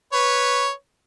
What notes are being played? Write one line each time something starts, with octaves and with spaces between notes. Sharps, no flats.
B4 C#5